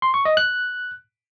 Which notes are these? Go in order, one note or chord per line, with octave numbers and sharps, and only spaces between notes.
C6
C#6
D#5
F#6